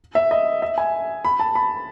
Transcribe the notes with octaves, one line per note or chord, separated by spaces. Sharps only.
E5
D#5
E5
G#5
B5
A5
B5